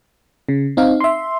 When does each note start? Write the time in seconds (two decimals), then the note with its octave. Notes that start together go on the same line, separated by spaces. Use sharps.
0.49 C#3
0.77 C4 D#4 F5
1.00 E5 C6